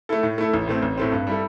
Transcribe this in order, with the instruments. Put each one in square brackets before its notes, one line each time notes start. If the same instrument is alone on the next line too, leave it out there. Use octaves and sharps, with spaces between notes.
[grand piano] A3 E4 A4
A2
A3 E4 A4
A1
A2 A3 C4
A1
A2 A3 C4
G2
G3 E4 A4